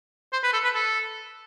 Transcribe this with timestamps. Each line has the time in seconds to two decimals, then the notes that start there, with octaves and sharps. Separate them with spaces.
0.33 C5
0.43 B4
0.53 A4
0.64 B4
0.75 A4